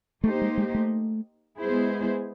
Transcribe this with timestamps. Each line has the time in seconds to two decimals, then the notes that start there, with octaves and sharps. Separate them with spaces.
0.24 A3 A#3 D#4 G4 C5
0.42 G#3
0.57 G#3
0.75 A3
1.58 G#3 B3 E4 G#4 C5